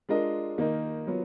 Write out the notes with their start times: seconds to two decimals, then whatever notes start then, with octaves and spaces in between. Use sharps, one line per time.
0.09 G#3 D4 F4 A#4 D#5
0.58 D#3 A#3 D#4 A#4 D#5
1.07 F#3 B3 F4